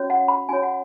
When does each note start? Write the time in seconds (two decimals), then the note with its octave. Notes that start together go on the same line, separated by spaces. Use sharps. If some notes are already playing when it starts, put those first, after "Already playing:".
Already playing: C#4 F#4 C#5
0.10 F#5
0.28 B5
0.49 C#4 F#4 C#5 G#5
0.63 F#5